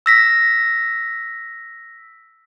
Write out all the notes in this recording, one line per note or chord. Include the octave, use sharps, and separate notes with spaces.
E6 A#6 B6